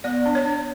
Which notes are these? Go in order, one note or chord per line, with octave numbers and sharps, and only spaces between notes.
B3 D5
D4
C#5
D4